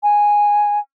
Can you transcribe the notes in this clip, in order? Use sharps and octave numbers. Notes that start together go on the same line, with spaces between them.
G#5